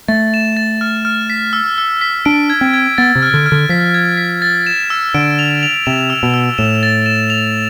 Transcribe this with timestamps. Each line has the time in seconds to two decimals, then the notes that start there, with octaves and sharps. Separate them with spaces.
0.08 A3 A6
0.34 E7
0.57 A6
0.81 F6
1.05 F6
1.30 B6
1.53 E6
1.78 E6
2.01 B6
2.25 D4 D7
2.50 G#6
2.61 C4
2.73 G#6
2.98 B3 A6
3.15 C3
3.22 F6
3.34 D3
3.46 F6
3.52 D3
3.69 F3 B6
3.94 G#6
4.17 B6
4.42 A6
4.67 E7
4.90 E6
5.14 D3 D7
5.39 F7
5.63 F7
5.86 C3 E7
6.10 E6
6.23 B2
6.34 E6
6.58 A2 E7
6.83 A6
7.06 E7
7.30 F7